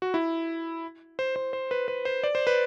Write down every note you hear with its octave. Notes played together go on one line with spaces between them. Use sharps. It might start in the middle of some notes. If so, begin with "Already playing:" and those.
F#4
E4
C5
C5
C5
B4
B4
C5
D5
C5
B4